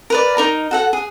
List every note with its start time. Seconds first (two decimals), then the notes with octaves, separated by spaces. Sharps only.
0.10 A#4 B4 D5
0.37 D#4 A#4 A#5
0.71 F#4 A4 F#5
0.93 G#4